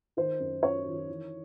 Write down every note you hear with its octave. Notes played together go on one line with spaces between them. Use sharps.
D#3 C5
F#2
F#2 C#5
D#3
E3